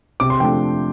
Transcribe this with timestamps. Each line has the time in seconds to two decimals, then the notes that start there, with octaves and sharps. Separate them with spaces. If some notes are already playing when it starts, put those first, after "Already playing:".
0.20 C3 D6
0.30 C6
0.40 F3 A3 D4 G5